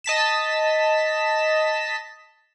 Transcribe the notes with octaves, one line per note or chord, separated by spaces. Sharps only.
D#5 A5 B6 E7